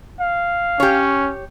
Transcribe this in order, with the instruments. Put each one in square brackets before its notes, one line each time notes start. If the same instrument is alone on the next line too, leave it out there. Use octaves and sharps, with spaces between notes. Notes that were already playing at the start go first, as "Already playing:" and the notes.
[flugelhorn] F5
[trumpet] C#4 [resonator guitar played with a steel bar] G4 C#5